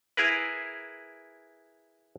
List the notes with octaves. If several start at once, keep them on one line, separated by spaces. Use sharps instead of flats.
E4 G#4 A#4 B4